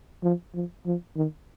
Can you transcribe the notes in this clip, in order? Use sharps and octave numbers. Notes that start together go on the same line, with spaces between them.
F3
F3
F3
D#3